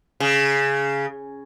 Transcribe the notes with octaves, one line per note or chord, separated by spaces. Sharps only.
C#3